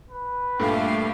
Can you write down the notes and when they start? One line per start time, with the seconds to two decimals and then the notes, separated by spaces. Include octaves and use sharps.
0.11 B4
0.59 G2 A#2 A3 G4 F5